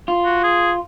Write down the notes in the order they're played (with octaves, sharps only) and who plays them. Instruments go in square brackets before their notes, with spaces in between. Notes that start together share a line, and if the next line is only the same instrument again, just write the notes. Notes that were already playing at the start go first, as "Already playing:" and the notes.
[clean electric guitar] F4
[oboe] F#4
G#4